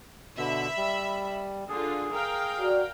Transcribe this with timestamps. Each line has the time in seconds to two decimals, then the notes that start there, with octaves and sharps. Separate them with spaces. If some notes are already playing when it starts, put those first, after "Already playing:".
0.37 B2 D3 E5 B5
0.77 G3
1.69 D3 F4 G#4
2.12 A#4 F5 G5
2.58 F#4 D5